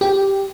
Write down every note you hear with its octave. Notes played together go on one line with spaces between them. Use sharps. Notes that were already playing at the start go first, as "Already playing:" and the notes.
G4